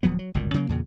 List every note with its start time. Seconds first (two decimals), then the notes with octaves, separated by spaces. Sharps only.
0.03 D1 F3 F#3 B3
0.19 F#3
0.34 G1 C#2 F#2 A#2
0.54 C#3 F#3 G3 A#3
0.69 E2 A#2 C#3